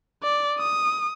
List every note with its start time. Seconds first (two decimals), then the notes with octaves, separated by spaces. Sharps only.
0.23 D5
0.59 D#6